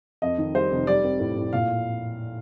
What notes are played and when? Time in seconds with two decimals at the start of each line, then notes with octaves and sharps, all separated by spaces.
0.22 F2 D#5
0.38 D#3
0.54 G3 C5
0.71 F1
0.87 G3 D5
1.04 C4
1.19 A2
1.37 A2
1.53 A#2 F5